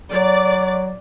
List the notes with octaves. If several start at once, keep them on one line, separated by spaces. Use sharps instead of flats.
F#3 D5